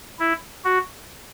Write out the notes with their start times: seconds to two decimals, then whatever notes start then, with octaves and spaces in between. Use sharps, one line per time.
0.19 E4
0.65 F#4